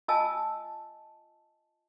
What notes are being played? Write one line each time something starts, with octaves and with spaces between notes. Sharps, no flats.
F4 D#5 G#5 A5 E6